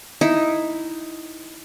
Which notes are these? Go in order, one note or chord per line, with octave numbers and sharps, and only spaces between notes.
D#4 E4